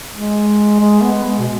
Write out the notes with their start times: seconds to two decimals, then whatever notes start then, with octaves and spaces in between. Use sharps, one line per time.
0.13 G#3
0.80 G#3
1.02 B3
1.24 G#3
1.39 B2